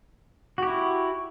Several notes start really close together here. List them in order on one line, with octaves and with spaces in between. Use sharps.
F#4 G4 E4